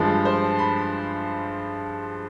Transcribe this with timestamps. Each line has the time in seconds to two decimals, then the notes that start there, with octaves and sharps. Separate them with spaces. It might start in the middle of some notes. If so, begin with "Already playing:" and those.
Already playing: G2 F3 G#3
0.25 C5
0.59 B5